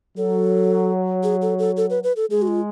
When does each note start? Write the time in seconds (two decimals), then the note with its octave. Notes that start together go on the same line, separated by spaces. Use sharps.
0.17 F#3 A4
1.23 G#4
1.42 A4
1.59 A4
1.77 A4
1.90 B4
2.03 B4
2.16 A4
2.31 G#3 G#4
2.42 F#4
2.48 F4